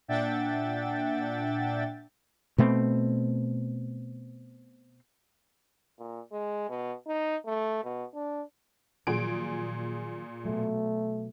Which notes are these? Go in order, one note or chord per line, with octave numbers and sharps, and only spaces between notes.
A#2 D4 E5 F#5 G5 A6
B2 A3 C4
A#2
G#3
B2
D#4
A3
B2
D4
A#2 D#3 F3 F#3 G#4 D7
B2 F#3 A3